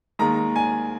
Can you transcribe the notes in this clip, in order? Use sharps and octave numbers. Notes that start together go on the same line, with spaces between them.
D#2 D#3 G#3 A#5
G#5